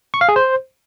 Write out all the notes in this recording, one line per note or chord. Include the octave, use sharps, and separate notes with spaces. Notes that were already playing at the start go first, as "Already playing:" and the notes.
C#6
F5
G#4
C5